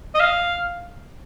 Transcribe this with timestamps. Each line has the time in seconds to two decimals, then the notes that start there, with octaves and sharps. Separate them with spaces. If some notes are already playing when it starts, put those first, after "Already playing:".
0.15 D#5
0.20 F5